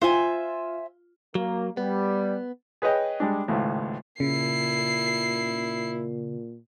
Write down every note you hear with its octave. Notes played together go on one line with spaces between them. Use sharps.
F4 C5 E5 G#5
F#3 A#3
G3 B3
G#4 B4 C#5 D#5 G5
G3 G#3 D4
G#1 C#2 A2
A#2 C#3 E4 C7